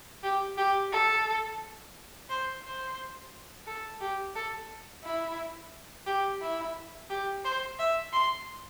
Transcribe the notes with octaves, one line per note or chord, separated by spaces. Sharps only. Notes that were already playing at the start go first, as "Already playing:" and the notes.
G4
G4
A4
C5
C5
A4
G4
A4
E4
G4
E4
G4
C5
E5
C6